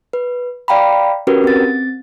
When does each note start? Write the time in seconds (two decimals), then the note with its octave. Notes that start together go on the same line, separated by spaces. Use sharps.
0.13 B4
0.68 D5 F5 G5 A#5 B5
1.27 C#4 F#4 G4 A#4 B4
1.44 C4 A6